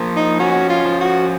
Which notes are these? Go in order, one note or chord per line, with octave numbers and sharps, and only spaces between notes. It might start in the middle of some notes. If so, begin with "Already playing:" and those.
Already playing: F3 A#3
D#4
C#4 F#4
F4
F3
F#4